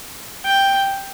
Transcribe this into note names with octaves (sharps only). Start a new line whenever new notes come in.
G5